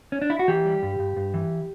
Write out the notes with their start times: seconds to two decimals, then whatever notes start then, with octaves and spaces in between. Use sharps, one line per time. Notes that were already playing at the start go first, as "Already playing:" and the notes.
0.12 C#4
0.22 D4
0.30 E4
0.39 F#4
0.48 E3 G4
0.65 G3
0.83 G2
0.99 G2
1.16 G2
1.34 E3